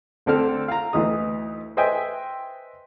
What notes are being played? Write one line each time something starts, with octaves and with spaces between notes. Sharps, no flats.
D2 D3 C4 D4 A4 F6
F5 A#5
D2 E3 D#4 D#6
B4 C5 D#5 E5 G5 G#5